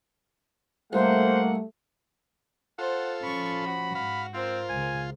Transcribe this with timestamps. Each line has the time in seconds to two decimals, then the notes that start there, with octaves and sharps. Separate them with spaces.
0.93 C2 A3 A#3 C5 F#5
2.79 F4 A4 C5 F#5
3.23 F3 C#4 B5 C#6
3.63 F#4
3.95 G#2 F5 B5
4.34 C4 F4 A#4 C5
4.70 C#2 C#3 G#5